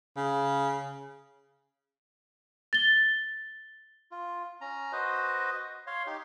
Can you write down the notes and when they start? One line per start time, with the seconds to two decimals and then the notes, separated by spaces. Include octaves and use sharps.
0.17 C#3
2.73 A6 G7
4.11 F4
4.61 C#4 A#5
4.92 F#4 B4 C5 D#5
5.87 C#5 F5 C6
6.07 D#4 G4